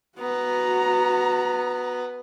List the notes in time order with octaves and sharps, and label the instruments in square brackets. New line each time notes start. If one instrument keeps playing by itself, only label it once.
[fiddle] B3 [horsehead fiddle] F#4 A#5